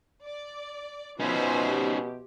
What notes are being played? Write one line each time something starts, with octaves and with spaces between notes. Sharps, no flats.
D5
B2 F3 C#4 D#4 B4 C5 E5 G#5
G4